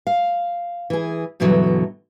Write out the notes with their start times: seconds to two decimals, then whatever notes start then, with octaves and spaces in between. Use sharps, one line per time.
0.07 F5
0.90 E3 G#4
1.40 G2 B2 D3 E3 F#3